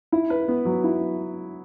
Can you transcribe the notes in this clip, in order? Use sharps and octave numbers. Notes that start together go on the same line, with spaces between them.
E4
B4
B3
F#3
E4